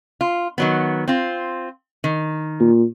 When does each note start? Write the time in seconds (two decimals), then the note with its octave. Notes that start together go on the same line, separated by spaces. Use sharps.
0.21 F4
0.58 D#3 F#3 B3
1.08 C4 F4
2.04 D#3
2.61 A#2